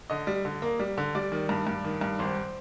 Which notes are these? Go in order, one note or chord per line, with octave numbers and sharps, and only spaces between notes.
D3 D#5
G3
D3
A#3
G3
D3
G3 D5
D#3
G2
G2
D#3
G2
G#1 C5